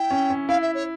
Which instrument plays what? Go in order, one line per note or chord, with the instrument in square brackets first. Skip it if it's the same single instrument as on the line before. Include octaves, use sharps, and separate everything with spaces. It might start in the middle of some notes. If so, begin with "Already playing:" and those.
Already playing: [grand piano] E4 [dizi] G5
[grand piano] C#4
C#4
[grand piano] E4 [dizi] F5
[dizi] E5
C#5